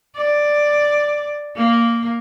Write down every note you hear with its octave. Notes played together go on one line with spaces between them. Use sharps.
D5
A#3